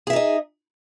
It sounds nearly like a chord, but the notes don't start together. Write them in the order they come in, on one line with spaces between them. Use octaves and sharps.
G#4 E5 D#4 D#5